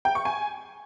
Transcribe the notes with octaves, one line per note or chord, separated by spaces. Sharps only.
G5
C#6
G#5